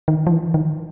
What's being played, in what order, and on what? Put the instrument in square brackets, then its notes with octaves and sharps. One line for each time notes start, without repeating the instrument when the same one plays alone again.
[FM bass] D#3
F3
E3
D#3